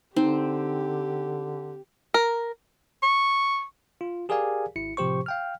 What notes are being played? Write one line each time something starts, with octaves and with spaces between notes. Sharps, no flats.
D3 C4 D#4 G4
A#4
C#6
F4
G4 G#4 A#4 D5 F5 G#5
G#1 E4 C#7
A2 C3 F3 G4 C5 C#6
F5 G5 F6